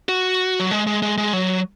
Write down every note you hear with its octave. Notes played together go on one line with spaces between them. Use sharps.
F#4
F#3
G#3
G#3
G#3
G#3
F#3